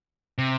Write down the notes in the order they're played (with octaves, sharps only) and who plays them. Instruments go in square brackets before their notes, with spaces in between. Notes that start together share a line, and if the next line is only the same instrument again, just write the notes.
[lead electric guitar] C3